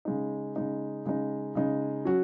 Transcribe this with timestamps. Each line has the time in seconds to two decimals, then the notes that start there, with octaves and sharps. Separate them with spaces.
0.05 C#3 G#3 D#4
0.56 C#3 G#3 D#4
1.05 C#3 G#3 D#4
1.55 C#3 G#3 D#4
2.05 F#3 C#4 F#4